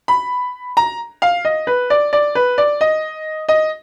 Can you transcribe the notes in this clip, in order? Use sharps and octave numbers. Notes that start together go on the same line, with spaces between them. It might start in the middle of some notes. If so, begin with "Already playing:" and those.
B5
A#5
F5
D#5
B4
D5
D5
B4
D5
D#5
D#5